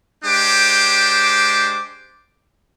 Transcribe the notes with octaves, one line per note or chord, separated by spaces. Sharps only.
G#3 D4 G4 C5 D6